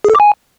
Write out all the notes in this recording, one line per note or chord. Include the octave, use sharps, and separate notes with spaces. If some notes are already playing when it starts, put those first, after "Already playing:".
G#4
A4
D6
G#5